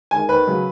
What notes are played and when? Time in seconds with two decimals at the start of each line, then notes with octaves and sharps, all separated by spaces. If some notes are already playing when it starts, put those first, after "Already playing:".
0.11 D#3 G#3 G#5
0.28 D#2 B4
0.47 C#3 F#3